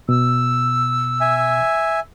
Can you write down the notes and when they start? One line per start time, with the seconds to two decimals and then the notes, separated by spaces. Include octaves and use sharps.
0.09 B2 E6
1.21 E5 G#5